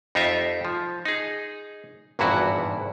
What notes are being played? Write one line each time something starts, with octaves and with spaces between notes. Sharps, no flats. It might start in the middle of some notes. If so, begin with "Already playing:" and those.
F2 D#4 F4 G4 E5
F3
D#4 G#4
G#1 E2 G2 A#2 E4 F#4